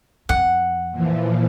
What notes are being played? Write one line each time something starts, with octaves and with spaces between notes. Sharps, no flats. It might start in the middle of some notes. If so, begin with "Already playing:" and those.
F2 F#5
A#2 E3 F3